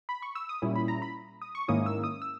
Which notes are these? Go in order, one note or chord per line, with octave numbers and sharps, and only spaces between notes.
B5
C#6
E6
D#6
A#2 G3 C#4 E4
B5
A#5
B5
D#6
C#6
G#2 D#3 A#3 C#4 E4 D#6
E6
D#6
E6